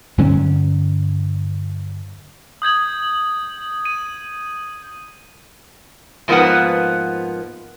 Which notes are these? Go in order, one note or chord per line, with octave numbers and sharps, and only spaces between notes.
G2 D3 F#3 C#4
D#6 G6 G#6 F#7
D#7
G#2 F3 A#3 B3 B4 F#5